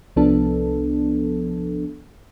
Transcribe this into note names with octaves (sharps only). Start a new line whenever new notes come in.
C2 F3 B3 D4 A4